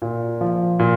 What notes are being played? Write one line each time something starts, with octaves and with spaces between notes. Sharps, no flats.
A#2
F3
A#2